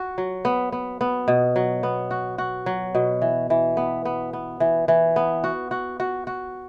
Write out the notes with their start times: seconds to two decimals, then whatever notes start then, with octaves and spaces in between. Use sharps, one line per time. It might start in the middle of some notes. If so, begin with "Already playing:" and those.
Already playing: F#4
0.18 F#3
0.45 B3
0.72 B3
1.01 B3
1.28 B2
1.56 F#3
1.83 B3
2.11 F#4
2.38 F#4
2.66 F#3
2.95 B2
3.22 E3
3.50 E3
3.77 B3
4.05 B3
4.33 B3
4.60 E3
4.88 E3
5.16 B3
5.44 F#4
5.71 F#4
6.00 F#4
6.27 F#4